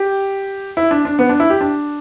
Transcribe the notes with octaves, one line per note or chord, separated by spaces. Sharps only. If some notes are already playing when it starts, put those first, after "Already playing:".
Already playing: G4
E4
D4
D4
B3
D4
E4
G4
D4